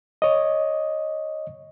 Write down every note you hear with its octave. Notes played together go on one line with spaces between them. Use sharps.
C#5 D#5